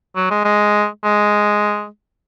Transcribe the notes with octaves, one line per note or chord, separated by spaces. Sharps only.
F#3
G#3
G#3
G#3